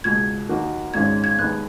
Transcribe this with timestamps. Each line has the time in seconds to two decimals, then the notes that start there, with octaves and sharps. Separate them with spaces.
0.04 C#2 B2 G#3 G#6
0.49 D#2 D#3 A#3 D#4 F#4
0.94 G#1 G#2 D#3 G#3 C#4 G#6
1.24 G#6
1.38 D#2 D#3 G#3 B3 F#6